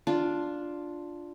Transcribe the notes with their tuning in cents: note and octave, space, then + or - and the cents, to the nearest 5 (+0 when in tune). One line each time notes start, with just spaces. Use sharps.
D4 +0 F4 +0